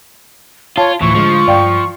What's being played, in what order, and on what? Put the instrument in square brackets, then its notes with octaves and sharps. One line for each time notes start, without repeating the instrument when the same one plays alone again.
[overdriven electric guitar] F4 [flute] C#5 [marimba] A5
[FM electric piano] D2 A2 F3 [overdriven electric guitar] E3 [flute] C#6
[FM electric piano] D3 G#3 [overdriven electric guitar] F3
[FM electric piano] G2 [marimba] D5 F5 G5